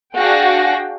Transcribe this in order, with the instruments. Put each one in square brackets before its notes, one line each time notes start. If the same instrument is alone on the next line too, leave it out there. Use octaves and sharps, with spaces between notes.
[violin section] D4 F#4 G#4 F5 G5 A#6